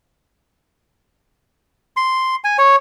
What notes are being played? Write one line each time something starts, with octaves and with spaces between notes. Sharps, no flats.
C6
G#5
C#5